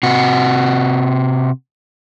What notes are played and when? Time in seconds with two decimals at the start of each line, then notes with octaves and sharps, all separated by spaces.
0.03 C3 F#4